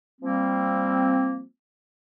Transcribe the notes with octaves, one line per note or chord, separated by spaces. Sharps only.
F3 G3 A#3 C4